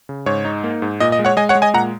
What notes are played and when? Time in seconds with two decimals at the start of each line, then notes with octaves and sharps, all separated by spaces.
0.09 C#3
0.26 G#2 C#5
0.45 D#4
0.64 A#3
0.82 G#2
1.00 A#2 D#5
1.12 D#5
1.19 G#3
1.25 C#5 F#5
1.37 G#3 D#5 G#5
1.49 C#5 F#5
1.55 G#3
1.62 D#5 G#5
1.74 A#2 F#5 A#5